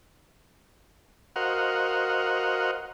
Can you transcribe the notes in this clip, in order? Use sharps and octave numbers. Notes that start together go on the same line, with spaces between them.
F#4 A#4 C5 D#5 F5 F#5